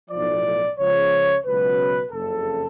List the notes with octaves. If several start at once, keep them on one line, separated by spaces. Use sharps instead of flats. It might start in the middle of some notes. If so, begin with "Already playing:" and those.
B1 A2 F3 D5
C#2 C#3 F3 C#5
C#2 B2 F#3 B4
F#1 F2 C#3 A4